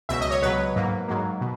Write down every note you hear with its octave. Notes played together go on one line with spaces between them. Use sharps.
C#2 B2 F#3 E5
D#5
C#5
C#2 B2 F#3 B4
G#2 F#3 A#3
G#2 F#3 A#3
B2